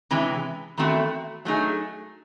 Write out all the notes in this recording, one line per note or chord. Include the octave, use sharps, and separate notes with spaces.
C3 E3 G#3 C#4
E2 D#3 A3 C4 F#4
F#3 A3 D#4 G#4